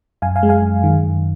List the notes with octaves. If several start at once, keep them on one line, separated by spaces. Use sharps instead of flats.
F#2 F5 G#5
F5 G#5
G#3
F5 G#5
F#2
D#3
F#2